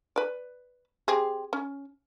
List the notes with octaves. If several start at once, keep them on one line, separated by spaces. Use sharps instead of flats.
B4 D5
C4 G4 G#4
C#4